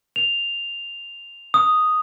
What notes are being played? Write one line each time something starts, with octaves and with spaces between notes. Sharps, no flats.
F7
D#6